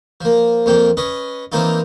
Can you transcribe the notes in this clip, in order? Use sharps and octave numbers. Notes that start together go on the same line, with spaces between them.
F3 A#3
F2 A#2 F3 A#3 G5
C#4 B4 D#5
E3 F3 A#3 C4 D#4 F4